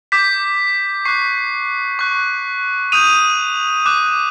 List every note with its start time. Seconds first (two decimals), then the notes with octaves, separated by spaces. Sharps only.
0.12 D6 G6 B6
1.05 C#6 F#6 C7
1.99 C#6 F#6
2.92 D#6 G6 D#7 F7
3.86 D6 F#6